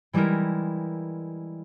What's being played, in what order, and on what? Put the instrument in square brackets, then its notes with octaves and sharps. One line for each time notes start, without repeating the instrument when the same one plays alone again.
[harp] E3 G3 G#3 E4 A#4